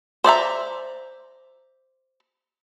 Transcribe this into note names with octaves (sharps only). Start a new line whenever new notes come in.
C5 D5 E5 A#5